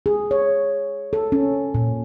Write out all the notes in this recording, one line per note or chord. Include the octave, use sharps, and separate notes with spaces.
G#4
C#5
A4
C#4
A#2